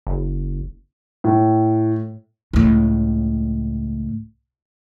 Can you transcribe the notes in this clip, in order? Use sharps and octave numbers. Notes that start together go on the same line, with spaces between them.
F#1
A2
C#2 A2